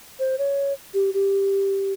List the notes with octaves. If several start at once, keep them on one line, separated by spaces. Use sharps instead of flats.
C5
C#5
G4
G4